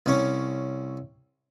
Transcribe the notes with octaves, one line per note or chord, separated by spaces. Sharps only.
C2 C#4